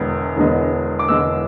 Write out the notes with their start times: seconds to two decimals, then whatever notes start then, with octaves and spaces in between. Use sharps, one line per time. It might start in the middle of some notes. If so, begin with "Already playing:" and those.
Already playing: E1 E2 D3 G#3 B3
0.37 E1 E2 D3 G#3 B3
0.99 D6
1.08 E1 E2 D3 G#3 B3 E6